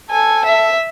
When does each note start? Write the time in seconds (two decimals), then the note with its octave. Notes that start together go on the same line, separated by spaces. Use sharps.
0.11 A4 G#5
0.46 E5